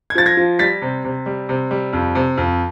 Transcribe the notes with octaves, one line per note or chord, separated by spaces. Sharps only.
G#6
F3 A6
G#6 A#6
F3
G3 A6 B6
C3
C3
G3
C3
G3
F2
C3
F2